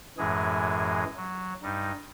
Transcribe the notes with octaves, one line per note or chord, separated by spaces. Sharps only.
F#2 A2 E3 G#3 G#4
F#3
G2 G3 D#4